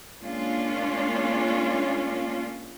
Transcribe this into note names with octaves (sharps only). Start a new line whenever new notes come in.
G#3 A#3 C#4 D4 F4